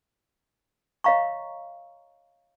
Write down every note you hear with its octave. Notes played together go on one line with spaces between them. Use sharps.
C#5 D#5 F5 A#5 C#6